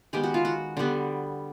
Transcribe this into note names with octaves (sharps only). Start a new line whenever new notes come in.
D#3 G#3 B3 G4
F#4
F4
F#4
D3 G3 B3